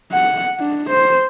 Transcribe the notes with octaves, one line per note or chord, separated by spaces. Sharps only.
F#5
D4
C5